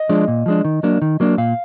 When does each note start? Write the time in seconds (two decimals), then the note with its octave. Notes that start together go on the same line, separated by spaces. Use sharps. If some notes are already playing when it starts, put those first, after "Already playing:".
Already playing: D#5
0.09 F3 G#3 D4
0.28 A#2
0.46 F3 G#3 D4
0.65 D#3
0.83 F#3 A#3 D4
1.02 D#3
1.20 F#3 A#3 D4
1.38 A#2 F5